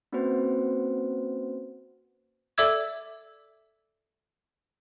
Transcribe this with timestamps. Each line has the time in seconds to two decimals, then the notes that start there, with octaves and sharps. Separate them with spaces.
0.12 A#3 C4 C#4 F#4 B4 C5
2.58 A4 D5 E5 D6 E6 G#6